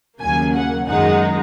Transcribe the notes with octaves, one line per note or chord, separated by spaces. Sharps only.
D#2 C#3 F#3 A#3 G#5
F#5
F#2 D#3 G#3 D#4 F#5